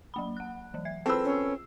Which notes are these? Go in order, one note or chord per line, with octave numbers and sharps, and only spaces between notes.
F#3 A#3 B5
F#5 F#6
E3 F#3
E5 G#6
C4 F4 G#4 A4 B4 E6 C7
C#4